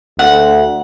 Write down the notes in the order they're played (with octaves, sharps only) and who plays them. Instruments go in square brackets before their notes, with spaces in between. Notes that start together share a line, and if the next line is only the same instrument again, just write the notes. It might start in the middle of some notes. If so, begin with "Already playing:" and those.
[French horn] D2 [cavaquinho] F#5